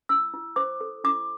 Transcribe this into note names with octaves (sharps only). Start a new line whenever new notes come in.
E4 E6
E4
C5 D6
A4
E4 D6